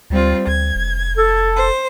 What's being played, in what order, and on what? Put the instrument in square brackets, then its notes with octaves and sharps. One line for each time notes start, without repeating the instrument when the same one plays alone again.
[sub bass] D2 [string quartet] G3 C4 F4
[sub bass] D2 [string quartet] G#6
[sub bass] F1
[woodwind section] A4
[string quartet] C5